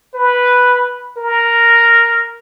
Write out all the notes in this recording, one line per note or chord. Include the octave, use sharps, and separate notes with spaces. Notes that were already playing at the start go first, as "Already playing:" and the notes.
B4
A#4